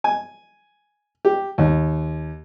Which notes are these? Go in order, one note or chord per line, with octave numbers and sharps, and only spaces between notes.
G#5
G4
D#2